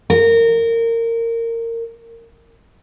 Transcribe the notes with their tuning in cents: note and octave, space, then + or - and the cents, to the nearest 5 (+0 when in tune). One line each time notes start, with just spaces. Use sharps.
A#4 -20